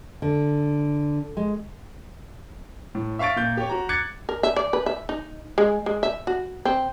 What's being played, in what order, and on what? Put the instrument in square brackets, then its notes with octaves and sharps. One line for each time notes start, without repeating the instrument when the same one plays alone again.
[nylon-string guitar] D3
G#3
[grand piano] A2
E5 F5 C#6 A6 D7
A#2 G6
G4 C#5
F#4 A#5
D6 F#6 G#6 A6 C#7
[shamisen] A#4
E5
D5
B4
E5
D#4
G#3
G#3
E5
F#4
C4